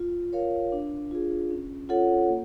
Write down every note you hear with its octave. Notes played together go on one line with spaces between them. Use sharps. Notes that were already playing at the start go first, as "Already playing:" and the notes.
Already playing: F4
A#4 C#5 F5
D4
F4 G#4
C#4
F4 A4 C#5 F#5
A#3